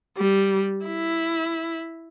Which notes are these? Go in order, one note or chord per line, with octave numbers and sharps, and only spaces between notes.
G3
E4